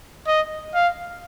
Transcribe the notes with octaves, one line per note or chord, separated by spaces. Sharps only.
D#5
F5